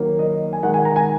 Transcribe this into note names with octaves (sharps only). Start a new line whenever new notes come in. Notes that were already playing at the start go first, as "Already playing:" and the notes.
Already playing: D#3 F#3 A#3
D#5
G#5
D#3 G#3 F#5
G#5
A#5
G#5